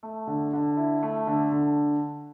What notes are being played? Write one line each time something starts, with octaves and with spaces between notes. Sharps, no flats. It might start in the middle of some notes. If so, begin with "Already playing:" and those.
A3
D3
D3
E4
A3
D3
D3